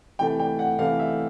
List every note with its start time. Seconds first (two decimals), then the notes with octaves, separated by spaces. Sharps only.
0.19 C3 E3 A3 G5
0.39 G5
0.59 F#5
0.79 C3 E3 A3 F5
0.99 E5